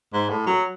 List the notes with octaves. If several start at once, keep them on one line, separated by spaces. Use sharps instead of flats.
G#2
A2
F#3